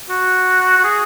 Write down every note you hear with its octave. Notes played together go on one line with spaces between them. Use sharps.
F#4
F#4
G#4